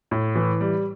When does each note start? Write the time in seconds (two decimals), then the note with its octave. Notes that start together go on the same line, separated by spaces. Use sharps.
0.11 A2
0.35 E3
0.61 G3